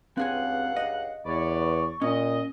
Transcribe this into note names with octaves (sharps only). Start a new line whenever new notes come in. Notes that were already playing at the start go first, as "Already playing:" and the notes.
C#2 G2 C4 G#4 F5 F#5 G#5
D#5
E2 B4 C#5 D5 C#6
A#2 C#4 D#5